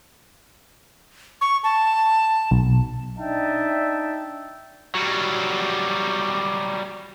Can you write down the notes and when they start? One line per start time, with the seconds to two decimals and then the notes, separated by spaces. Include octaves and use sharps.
1.41 C#6
1.64 A5
2.51 B1
3.16 D4 D#4 D#5 E5 G5 A5
4.95 F#3 G3